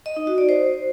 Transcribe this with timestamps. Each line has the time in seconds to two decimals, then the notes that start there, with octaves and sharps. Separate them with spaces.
0.06 D#5
0.17 D#4
0.27 F#4
0.38 D5
0.49 C5